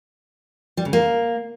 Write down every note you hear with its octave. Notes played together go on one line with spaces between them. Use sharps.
G3
C#3
A#3